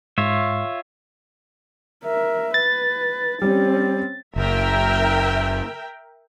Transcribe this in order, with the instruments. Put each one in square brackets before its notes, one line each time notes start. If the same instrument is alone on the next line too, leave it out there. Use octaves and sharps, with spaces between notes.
[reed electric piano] G#2 [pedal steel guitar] F4 C#5 E5
[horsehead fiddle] A#4 E5
[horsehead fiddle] B4 [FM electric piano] A6
[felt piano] G3 G4 [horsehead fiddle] C4 C#4
[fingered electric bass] F#1 [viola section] A#4 E5 G5